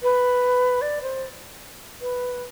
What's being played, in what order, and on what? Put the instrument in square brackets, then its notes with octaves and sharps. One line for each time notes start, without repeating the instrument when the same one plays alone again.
[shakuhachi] B4
D5
C5
B4